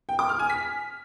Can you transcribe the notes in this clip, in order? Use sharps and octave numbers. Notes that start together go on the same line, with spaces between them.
G5
D6
F6
G#5
B6